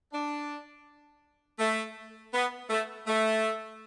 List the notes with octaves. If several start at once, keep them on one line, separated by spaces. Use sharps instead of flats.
D4
A3
B3
A3
A3